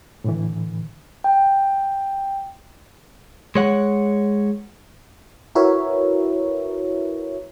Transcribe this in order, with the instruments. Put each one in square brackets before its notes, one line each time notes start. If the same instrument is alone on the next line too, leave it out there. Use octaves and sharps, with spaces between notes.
[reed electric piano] A2 D3 E3
[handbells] G5
[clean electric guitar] G#3 C#5 F#5
[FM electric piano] E4 F#4 A#4 B4 C#5 E5